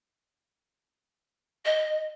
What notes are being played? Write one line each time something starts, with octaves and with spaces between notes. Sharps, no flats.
D#5